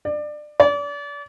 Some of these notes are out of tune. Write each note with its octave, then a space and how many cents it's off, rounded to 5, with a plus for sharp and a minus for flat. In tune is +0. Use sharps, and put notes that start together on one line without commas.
D5 +25
D5 -35